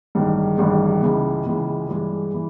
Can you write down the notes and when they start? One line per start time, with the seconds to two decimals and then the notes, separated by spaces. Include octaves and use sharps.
0.15 A1 G2 D#3 G#3
0.58 A1 G2 D#3 G#3
1.02 C#2 C#3 E3 G#3
1.45 C#2 C#3 E3 G#3
1.89 G2 E3 G#3
2.34 E3